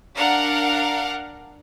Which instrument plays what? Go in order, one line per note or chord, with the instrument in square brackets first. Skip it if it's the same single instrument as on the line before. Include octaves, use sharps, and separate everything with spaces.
[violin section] D4 A#4 F5 F#5